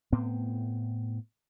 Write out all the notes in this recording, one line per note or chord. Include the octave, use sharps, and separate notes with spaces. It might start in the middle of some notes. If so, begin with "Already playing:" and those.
A2 B3 C4